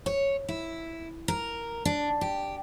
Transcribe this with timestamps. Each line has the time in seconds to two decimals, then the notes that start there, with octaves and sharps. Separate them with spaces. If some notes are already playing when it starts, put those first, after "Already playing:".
0.06 C#5
0.49 E4
1.28 A#4
1.85 D4
2.21 G4